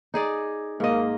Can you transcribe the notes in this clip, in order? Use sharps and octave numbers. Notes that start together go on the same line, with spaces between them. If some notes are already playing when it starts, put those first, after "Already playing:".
D#4 G#4 D5
G#2 A#3 D#5